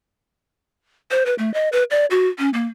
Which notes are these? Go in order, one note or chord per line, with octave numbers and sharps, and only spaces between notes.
C5
B4
A3
D#5
B4
D5
F#4
C#4
A#3